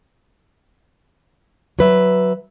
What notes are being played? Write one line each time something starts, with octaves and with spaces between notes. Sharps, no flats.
F#3 B4 E5